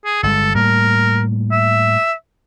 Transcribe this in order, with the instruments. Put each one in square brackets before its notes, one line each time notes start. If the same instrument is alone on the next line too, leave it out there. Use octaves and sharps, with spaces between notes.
[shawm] G#4
[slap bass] G1 G#3 [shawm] A4
[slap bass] A2 G3 A#3 [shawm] A#4
[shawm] E5